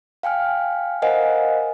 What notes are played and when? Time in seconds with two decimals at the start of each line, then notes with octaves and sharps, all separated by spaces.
0.23 F5 G5 G#5 F6
1.02 A#4 C5 D#5 F5 F#5 G#5